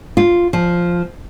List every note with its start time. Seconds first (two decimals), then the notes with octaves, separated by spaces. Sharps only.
0.17 F4
0.53 F3